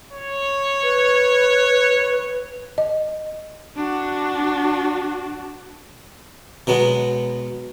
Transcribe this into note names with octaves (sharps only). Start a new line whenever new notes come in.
C#5
B4
D#5
D4 F#4
B2 F#3 G#3 B3